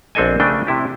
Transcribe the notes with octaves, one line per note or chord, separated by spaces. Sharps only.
A#1 C4 D4 A4 D#5 G#5
C#3 A3 D4 G5
C3 E4 G4